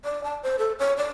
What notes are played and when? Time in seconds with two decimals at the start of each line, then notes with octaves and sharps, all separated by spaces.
0.05 D5
0.24 A5
0.43 C5
0.59 A4
0.79 C#5
0.97 D5